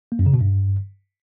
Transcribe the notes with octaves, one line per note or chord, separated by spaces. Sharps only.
A#3
F#2
C#3
B2
G2